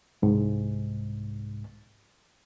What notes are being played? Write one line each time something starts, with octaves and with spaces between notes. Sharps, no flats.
C2 G#2